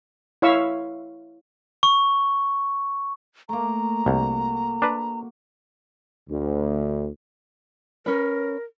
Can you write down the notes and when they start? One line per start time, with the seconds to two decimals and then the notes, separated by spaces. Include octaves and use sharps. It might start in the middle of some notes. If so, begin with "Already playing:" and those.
0.42 E4 C#5 E5 F5 C#6 E6
1.83 C#6
3.49 A3 A#3 A#5
4.06 C2 F#4
4.82 D4 B4
6.29 D2
8.06 C#4 A#4 B4